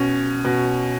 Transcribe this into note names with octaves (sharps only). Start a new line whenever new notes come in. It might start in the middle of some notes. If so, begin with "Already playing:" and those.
Already playing: B2 C#4
B2